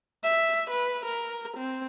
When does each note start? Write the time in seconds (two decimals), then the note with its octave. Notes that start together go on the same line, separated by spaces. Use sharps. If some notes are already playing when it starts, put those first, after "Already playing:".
0.24 E5
0.70 B4
1.06 A#4
1.57 C4